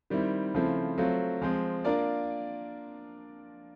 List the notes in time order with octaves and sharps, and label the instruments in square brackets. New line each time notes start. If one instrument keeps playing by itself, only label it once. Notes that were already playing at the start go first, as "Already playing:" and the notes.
[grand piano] D#3 G3 C4 E4
C#3 F3 A3 C4 E4
F#3 A3 C4 F4
F3 G#3 C4
A#3 D4 F4 A#4 D5